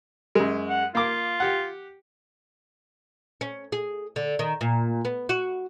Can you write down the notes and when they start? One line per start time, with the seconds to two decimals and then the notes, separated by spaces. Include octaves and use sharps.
0.35 F#2 G#3
0.69 F#5
0.95 A#3 F4 D6
1.40 G4 F#5
3.41 C#4
3.72 G#4
4.16 D3
4.39 D#3
4.61 A#2
5.05 B3
5.29 F#4